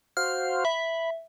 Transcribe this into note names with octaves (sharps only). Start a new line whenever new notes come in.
F#4 C5 F5 F6
E5 B5